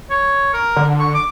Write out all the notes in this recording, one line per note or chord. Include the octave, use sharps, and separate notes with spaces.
C#5
A#4
D3
C#6
D6